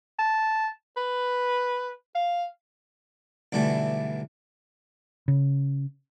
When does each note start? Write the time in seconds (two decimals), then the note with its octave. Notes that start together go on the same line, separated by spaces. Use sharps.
0.19 A5
0.97 B4
2.15 F5
3.52 B1 G2 D3 E3 A3
5.28 C#3